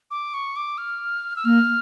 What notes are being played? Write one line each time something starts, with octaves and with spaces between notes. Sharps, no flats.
D6
C#6
D6
F6
E6
A#3 F6